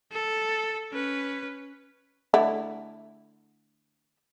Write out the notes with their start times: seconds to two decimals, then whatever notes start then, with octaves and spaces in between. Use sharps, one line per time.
0.12 A4
0.92 C#4 B4
2.34 D3 A3 E4